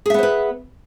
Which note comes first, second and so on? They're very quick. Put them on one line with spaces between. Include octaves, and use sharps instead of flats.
G#4 E5 B3 C5 B4